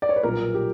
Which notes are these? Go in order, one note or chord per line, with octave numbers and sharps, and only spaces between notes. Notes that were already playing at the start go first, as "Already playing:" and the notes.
D5
C#5
B4
B1 A#2 G3 A#4
G4